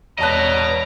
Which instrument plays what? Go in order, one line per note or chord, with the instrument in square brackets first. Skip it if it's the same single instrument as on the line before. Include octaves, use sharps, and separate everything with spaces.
[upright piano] E1 A5 F#6 [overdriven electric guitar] B4 D#5 [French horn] C#5 [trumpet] A#5